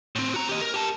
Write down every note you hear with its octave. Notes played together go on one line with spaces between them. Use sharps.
A2 C4
F#4 A#5
G4 D#5
A#4
G4 A5